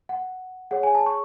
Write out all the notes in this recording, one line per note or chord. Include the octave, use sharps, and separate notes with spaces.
F#5
G#4 C#5 F#5
G#5
A5
C#6